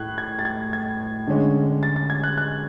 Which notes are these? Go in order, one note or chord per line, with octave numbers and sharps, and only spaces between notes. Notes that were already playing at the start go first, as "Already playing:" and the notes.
Already playing: A2 F#6 G#6
G#6
A6
G#6
G#6
D3 G#3 C#4
A6
A6
G#6
F#6
F#6